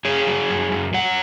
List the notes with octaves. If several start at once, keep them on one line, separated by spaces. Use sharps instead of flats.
F#2 G#4 C#5
F#3
F#2
F#2
F#2 C#5 F#5